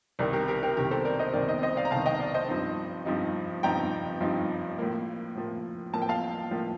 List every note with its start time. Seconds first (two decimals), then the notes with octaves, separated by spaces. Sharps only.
0.19 C2 C3 D#3 A#4 D5
0.33 G4 A#4
0.48 G4 A#4
0.63 G4 A#4
0.76 C2 C3 D#3 G4 A#4
0.91 A4 C5
1.05 A#4 D5
1.19 C5 D#5
1.34 C2 C3 D#3 A#4 D5
1.48 C5 D#5
1.63 C5 D#5
1.77 D5 F5
1.85 A#5
1.91 C2 C3 D#3 F5 A5
2.06 D#5 G5
2.20 D5 F5
2.34 C5 D#5
2.48 G2 F3 C4 D#4
3.06 G2 F3 C4 D#4
3.63 G2 F3 C4 D#4 G5 A#5
4.21 G2 F3 C4 D#4
4.78 A2 F3 A#3
5.35 A2 F3 A#3
5.93 A2 F3 A#3 A5
6.02 G5
6.09 F5 A5
6.51 A2 F3 A#3